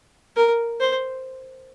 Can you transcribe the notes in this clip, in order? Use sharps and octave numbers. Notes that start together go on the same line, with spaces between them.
A#4
C5